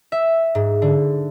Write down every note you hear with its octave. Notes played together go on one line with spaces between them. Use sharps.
E5
G#2
D3